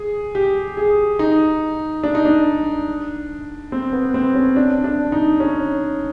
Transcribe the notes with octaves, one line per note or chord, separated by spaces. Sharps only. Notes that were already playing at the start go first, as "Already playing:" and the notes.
Already playing: G#4
G4
G#4
D#4
D4
D#4
D4
C4
B3
C4
C#4
D4
D4
D#4
C#4